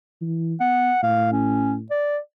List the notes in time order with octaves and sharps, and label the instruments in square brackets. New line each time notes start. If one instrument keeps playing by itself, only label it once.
[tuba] E3
[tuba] B3 [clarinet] F#5
[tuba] A2 [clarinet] F5
[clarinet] C#4
D5